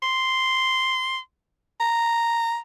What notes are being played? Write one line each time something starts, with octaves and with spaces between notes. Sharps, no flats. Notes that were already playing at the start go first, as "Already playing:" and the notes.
C6
A#5